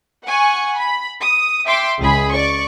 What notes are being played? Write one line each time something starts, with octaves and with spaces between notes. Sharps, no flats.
F#5 G#5 C#6
B5
D#6
E5 G5 C6 D6
C#2 G#4 B5
D5 C#6